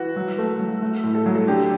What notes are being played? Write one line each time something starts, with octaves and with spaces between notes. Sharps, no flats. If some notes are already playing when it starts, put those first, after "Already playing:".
Already playing: E3 F#4
F#3
A3
F#3
A3
A2
A4
F#3
A4
D3 G4